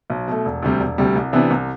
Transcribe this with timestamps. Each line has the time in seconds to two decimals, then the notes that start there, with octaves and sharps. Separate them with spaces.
0.10 B1
0.28 B2 A3
0.45 E1
0.63 D2 C3 G3
0.80 E1
0.98 D2 C3 G3
1.16 C2
1.33 C3 E3 B3 D4
1.51 C2